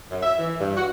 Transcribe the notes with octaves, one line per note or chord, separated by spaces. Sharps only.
F#2
E5
E3
G2
F#4